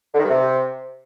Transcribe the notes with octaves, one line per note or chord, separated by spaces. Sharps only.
D3
D#3
G2
C3